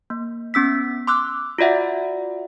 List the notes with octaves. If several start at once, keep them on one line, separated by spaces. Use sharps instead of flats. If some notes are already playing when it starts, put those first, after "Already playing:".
A#3
B3 C#4 E6 B6
C6 D6 E6 F#6
F4 F#4 D5 E5 F#5